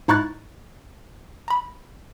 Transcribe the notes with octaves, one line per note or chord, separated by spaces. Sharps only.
G#2 D#4 E4 C#6 F#6 A6
A#5 B5